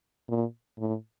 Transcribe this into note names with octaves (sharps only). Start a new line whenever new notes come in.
A#2
A2